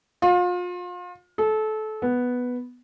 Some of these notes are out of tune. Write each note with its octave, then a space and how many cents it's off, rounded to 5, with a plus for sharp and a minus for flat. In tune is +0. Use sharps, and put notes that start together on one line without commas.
F4 +35
A4 -25
B3 +0